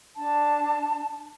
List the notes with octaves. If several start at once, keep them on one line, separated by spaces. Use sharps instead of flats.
D4 A5